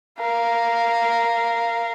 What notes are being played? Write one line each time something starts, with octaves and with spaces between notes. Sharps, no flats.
A#4 F5